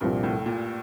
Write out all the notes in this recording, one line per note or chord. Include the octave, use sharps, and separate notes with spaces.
C2 G2 A#2 F3 C4
A2
A#2